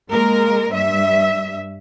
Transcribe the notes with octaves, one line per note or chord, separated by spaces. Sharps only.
G#3 A#3 A#4
G2 E5